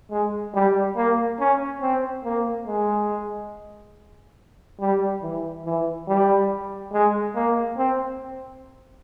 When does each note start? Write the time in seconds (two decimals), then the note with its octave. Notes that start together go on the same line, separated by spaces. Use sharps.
0.11 G#3
0.54 G3
0.96 A#3
1.39 C#4
1.82 C4
2.24 A#3
2.67 G#3
4.80 G3
5.22 E3
5.65 E3
6.08 G3
6.93 G#3
7.35 A#3
7.78 C4